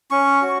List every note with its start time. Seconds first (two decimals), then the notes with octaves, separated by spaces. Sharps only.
0.11 C#4 C#6
0.42 F#4